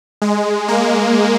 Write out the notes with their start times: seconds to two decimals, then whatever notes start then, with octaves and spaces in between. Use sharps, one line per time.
0.22 G#3
0.68 A#3